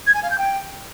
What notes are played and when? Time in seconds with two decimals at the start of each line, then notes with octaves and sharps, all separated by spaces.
0.06 G#6
0.14 G#5
0.22 F5
0.30 G6
0.38 G5